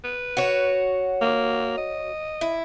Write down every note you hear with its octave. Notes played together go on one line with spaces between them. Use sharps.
B4
F#4 C#5
A#3
D#5
E4